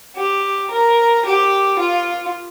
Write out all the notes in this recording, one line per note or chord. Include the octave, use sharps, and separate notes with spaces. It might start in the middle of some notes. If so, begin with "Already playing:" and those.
G4
A#4
G4
F4